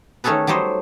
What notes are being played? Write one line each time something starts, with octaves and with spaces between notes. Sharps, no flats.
D#3 A3 C#4 G#4 A4 B4
F#3 G3 A3 C5 D#5